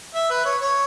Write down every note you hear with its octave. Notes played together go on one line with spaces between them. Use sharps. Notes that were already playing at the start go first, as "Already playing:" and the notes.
E5
B4
C#5
C#5